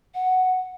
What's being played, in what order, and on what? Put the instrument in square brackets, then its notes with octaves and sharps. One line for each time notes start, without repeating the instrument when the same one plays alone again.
[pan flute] F#5